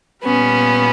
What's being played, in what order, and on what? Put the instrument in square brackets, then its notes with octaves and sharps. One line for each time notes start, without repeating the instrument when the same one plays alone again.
[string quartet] A#2 G3 B3 C#4